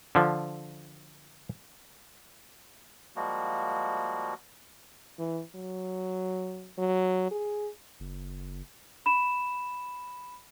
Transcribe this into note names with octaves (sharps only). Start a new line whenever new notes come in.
D3 F3
F3 G3 G#3 A#3 F#4
E3
F#3
F#3
G#4
F#1
B5 E7